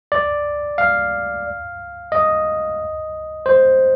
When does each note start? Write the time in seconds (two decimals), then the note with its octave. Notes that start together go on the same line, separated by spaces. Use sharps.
0.12 D5
0.78 F5
2.12 D#5
3.46 C5